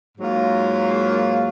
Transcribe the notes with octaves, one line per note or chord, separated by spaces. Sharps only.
G#2 F#3 A#3 F4